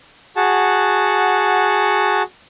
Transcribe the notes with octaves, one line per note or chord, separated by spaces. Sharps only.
F#4 G#4 F#5 A5